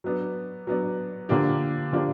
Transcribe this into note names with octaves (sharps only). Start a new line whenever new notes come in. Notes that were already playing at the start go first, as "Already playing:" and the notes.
F#3 B3 D4
F#3 B3 D4
D3 F3 A#3 D4 G4
D3 F3 A#3 D4 G4